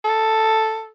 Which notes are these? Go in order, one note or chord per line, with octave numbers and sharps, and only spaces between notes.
A4